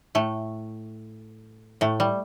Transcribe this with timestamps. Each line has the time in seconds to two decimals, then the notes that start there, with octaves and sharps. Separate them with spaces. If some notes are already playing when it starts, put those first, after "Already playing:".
0.15 A2 A3
1.81 A2 A3
2.00 G3